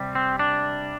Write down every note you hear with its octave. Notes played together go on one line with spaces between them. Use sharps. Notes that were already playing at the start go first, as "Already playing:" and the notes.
Already playing: C3 G3
C4
D4